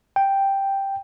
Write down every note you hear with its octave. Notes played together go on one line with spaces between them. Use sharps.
G5